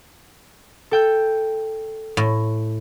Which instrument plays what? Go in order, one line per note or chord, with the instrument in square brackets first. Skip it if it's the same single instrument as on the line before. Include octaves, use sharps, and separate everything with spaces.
[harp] A4 G5 G6
[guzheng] A2